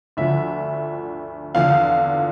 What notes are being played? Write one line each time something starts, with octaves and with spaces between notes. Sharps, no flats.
D2 D3 F3 E5
E2 D3 F3 F5